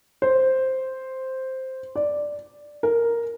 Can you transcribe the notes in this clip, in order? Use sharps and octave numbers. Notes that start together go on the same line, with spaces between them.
C5
D5
A#4